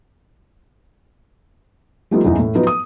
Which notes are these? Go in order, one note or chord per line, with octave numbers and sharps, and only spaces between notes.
F3 G3 A3 B3 D#4 F4
F#1 E2 E3 D#4
A2
F3 F#3 B3 D#4 B4
D#6